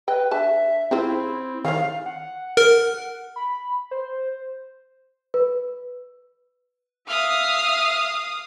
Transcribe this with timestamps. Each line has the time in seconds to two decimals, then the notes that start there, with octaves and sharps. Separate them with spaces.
0.08 B4 D#5 G5
0.31 D3 E5 A5
0.91 C#3 C4 E4 F4 C5
1.65 D#3 E3 C#4 F5
2.06 F#5
2.57 A#4
3.36 B5
3.91 C5
5.34 B4
7.08 E5 F5 D#6 F6